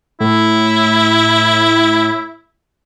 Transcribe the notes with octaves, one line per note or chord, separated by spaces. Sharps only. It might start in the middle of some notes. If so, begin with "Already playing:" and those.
A2 E4